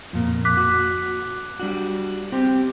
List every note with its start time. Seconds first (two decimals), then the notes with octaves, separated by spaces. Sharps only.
0.13 F2 A#2
0.45 D6 F#6 B6
0.57 F#4
1.59 G3 D4 F#4
2.32 C4 G4